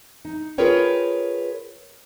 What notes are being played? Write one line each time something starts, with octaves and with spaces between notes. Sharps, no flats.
D#4
F4 G#4 A#4 B4 C#5 G5